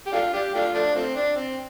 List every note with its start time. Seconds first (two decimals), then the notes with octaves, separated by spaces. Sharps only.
0.07 G4
0.13 A3 D4 F4
0.34 D4 G4
0.54 A3 D4 F4
0.74 F3 A3 D4
0.96 F3 A3 C4
1.16 D4
1.36 C4